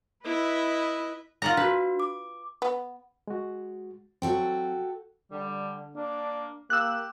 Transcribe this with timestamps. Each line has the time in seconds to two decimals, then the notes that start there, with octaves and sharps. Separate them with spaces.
0.25 E4 B4 D#5 E5
1.42 F4 F#5 A#5
1.57 D4 F#4 B4
2.00 D6
2.62 B3
3.28 G#3 F#4
4.22 F#3 C4 F#4 A4 G5
5.31 D3 G3
5.96 A#3 D4
6.70 A#3 G4 E6 F#6